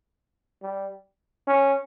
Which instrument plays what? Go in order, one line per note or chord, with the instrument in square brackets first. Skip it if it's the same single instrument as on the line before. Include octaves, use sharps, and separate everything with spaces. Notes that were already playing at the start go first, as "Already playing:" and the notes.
[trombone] G3
C#4